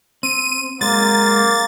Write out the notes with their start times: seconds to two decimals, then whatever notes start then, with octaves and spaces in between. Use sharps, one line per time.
0.23 C4 D#7
0.81 F#3 G#3 A#3 C4 A6